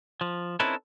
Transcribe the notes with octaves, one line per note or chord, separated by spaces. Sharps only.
F3
C4 C#4 D#4 E4 A4 B4